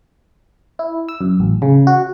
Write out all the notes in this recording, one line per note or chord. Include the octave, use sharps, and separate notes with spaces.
E4
E6
F#2
A1
C#3
F#4